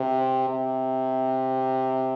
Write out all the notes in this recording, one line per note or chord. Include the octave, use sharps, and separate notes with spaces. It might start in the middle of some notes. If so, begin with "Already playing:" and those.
Already playing: C3
C3